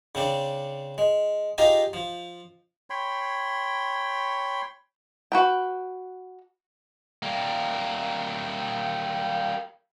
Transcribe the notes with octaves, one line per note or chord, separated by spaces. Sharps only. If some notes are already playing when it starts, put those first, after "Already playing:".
C#3 C4 D4
G#3
D#4 F4 G4 G#4 D#5
F3
C#5 G5 B5 C6
F#4 B4 G5
G3 A#3